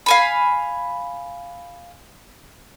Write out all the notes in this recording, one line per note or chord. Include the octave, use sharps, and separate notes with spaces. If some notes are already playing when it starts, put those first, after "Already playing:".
F5 G#5 B5